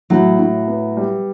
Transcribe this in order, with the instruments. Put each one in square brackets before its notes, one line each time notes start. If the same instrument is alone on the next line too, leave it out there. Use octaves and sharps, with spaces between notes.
[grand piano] A2 [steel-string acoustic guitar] F#3
[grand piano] A2
B3
G3